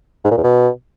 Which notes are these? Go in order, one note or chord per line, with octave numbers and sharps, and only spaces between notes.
G#2
A#2
E2
B2